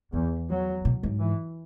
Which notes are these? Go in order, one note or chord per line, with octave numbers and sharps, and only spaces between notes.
E2 E3
F#3
B2
G#2
E3